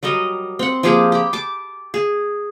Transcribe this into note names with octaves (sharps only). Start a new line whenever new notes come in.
F#3 G3 A#4 D#5
C4 F#5
F3 A#3 G4 G#4
G4 B5
A5 D6
G#4